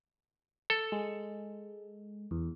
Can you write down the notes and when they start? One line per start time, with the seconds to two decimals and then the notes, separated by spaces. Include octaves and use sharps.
0.70 A4
0.92 G#3
2.31 E2